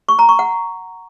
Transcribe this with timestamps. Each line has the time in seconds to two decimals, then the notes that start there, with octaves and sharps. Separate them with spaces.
0.09 C#6
0.19 A#5
0.29 C#6
0.39 F#5